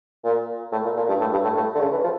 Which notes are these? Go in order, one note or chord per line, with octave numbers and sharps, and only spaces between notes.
A#2
A2
A#2
A#2
G2
A2
G2
A2
A2
D3
C#3
E3
F3